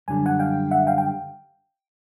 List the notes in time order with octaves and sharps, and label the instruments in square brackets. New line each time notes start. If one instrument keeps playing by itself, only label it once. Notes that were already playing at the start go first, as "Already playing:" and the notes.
[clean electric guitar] F#2 D3 G3 [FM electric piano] G#5
[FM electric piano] F#5 G#5
F5 G5
E5 F#5
F5 G5
G5